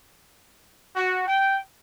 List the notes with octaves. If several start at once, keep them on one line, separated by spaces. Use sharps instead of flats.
F#4
G5